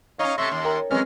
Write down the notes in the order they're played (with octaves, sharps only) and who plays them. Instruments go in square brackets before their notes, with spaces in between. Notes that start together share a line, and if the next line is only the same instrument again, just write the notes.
[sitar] C#4 D#4 [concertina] C#5 D#5 F5
[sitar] C3 A3 [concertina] E5 C6 C#6 [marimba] A#6
[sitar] D#2 [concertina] C6
[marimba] A#4 G5 A#5
[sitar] D3 F#3 [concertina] G#3 C#4 F6 [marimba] C4 B4